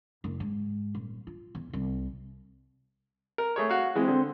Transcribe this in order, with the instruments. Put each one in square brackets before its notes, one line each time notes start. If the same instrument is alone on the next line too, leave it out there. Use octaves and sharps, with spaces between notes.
[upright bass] F#1
G#2
D#1
F4
E2
C2
[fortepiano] A#4
A3 G#4 C#5
[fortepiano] F#4 F5 [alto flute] F#5
[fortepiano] E3 G#3 [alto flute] C4
[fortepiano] D3